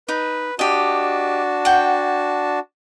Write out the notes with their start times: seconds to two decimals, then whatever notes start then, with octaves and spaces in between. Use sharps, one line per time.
0.09 D#4 B4
0.59 D4 F#4 G4 D#5 A5
1.65 F#5 G5